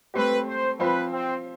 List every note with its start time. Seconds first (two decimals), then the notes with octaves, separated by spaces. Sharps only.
0.14 A3 C4 G4 B4
0.47 C5
0.79 F3 C4 F4 B4 C5
1.12 C4